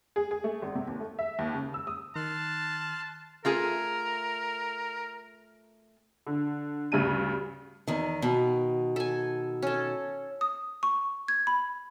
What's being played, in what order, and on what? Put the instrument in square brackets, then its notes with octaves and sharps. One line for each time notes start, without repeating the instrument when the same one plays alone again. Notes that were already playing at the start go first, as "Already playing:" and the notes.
[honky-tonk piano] G#4
G#4
A3
G#1
C3
D#2
A3
E5
D#2
C#3
E6
D#6
[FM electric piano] D#3 [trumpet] A5 [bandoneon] C6 F6 F#6
[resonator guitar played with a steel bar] A3 F4 G#4 [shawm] A#4
[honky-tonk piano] D3
D2 G2 C#3 D#7
[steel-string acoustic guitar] E2 D#3
B2 D#3
[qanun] A4 G#5
C#4 A4
[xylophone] D#6
C#6
G#6
B5